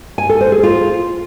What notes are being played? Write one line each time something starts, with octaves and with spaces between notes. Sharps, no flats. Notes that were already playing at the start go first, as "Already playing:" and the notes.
G#5
A4
C5
G#4
F4